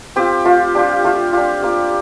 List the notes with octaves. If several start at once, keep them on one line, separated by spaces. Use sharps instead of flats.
C4 F4 G4
A3 F4
D4 F4 G4
A3 F4
D4 F4 G4
A#3 G4